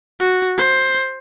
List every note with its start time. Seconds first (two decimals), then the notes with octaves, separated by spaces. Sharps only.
0.20 F#4
0.58 C5